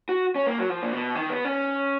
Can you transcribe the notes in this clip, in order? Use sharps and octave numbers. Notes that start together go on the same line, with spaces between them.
F#4
C#4
A#3
F#3
F3
A#2
B2
D#3
B3
C#4